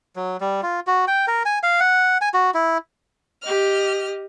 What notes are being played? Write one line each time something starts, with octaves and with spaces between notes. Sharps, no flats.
F#3
G3
F4
F#4
G5
A#4
G#5
F5
F#5
G#5
F#4
E4
G4 D#5 F6